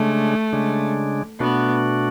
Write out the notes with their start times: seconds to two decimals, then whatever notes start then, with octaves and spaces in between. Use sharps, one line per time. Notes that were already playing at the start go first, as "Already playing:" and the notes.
Already playing: C#3 G#3 A3 D4
0.53 C#3 G#3 D4
1.40 B2 A3 B3 D4 F#4